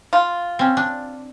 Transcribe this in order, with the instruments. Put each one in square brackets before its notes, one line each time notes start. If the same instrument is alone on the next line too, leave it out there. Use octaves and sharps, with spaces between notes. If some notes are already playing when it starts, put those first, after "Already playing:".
[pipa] F4
[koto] C4 C#4
D4